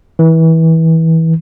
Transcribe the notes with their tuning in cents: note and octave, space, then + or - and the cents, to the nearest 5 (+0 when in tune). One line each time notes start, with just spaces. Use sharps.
E3 -25